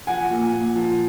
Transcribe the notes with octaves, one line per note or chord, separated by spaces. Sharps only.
F3 F#5 G#5
A#2
A#2
F3